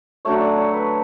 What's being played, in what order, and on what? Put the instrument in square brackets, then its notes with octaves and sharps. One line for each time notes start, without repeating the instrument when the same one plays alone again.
[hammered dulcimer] D3 F#3 A3 C#5
D5
C#5
B4